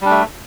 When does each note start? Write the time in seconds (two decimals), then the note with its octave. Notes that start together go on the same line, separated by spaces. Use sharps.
0.01 G3
0.06 D4
0.10 A3